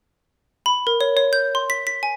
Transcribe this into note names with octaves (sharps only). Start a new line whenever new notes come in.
B5
A#4
C#5
C#5
G6
C6
B6
B6
G#5